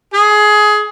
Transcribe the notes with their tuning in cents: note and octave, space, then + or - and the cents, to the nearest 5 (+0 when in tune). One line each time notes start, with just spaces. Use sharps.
G#4 +20